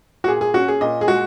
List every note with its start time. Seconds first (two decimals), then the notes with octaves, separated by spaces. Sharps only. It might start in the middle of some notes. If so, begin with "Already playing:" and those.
0.24 F#4
0.28 A#2 G#4
0.41 G#4
0.54 C#4 F#4
0.68 G#4
0.81 A#2 D#5
1.01 G#4
1.08 G#3 F#4